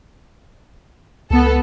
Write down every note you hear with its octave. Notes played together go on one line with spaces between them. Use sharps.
C#2 B3 A4